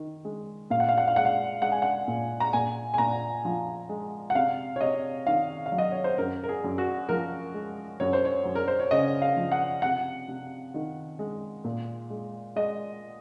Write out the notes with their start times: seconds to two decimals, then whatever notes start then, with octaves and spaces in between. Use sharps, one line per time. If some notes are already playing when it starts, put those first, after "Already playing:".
Already playing: D#3
0.25 G#3
0.70 A#2 F5
0.80 F#5
0.89 F5
0.98 F#5
1.08 F5
1.16 G#3 F#5
1.25 F5
1.62 G#3 F#5
1.72 G#5
1.82 F#5
2.08 A#2
2.40 A#5
2.53 A#2 G#5
2.94 G#5
2.98 A#2 A#5
3.45 F3
3.89 G#3
4.30 F#5
4.35 C3 F5
4.76 C#5
4.81 C3 D#5
5.26 D#3 F5
5.66 F5
5.72 F#3
5.78 D#5
5.92 C#5
6.04 C5
6.18 F#2 A#4
6.43 A#4
6.49 G#4
6.64 F#2
6.78 F#4
7.09 F3 A#4
7.54 G#3
8.00 F#2 C#5
8.13 C5
8.25 C#5
8.45 F#2
8.55 A#4
8.68 C5
8.80 C#5
8.91 C#3 D#5
9.22 F5
9.36 F3
9.52 F#5
9.82 C3 F#5
10.28 C3
10.74 D#3
11.19 G#3
11.64 A#2
12.10 G#3
12.56 G#3 D#5